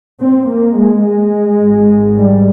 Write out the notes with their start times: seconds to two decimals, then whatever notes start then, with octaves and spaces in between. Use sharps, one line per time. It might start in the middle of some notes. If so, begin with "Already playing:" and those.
0.21 C4
0.49 A#3
0.77 G#3
1.05 G#3
1.61 G#1 G#2
2.17 G3